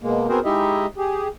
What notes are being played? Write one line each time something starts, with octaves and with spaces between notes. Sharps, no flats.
B2 G#3 A#3
B3 C4 F#4 G#4 A#4 C5
G#3 D#4 E4 G4 D#5 E5
G4 G#4